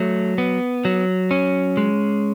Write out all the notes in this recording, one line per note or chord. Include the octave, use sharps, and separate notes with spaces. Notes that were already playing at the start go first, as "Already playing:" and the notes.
Already playing: F#3 A3
B3
F#3
C#4
G#3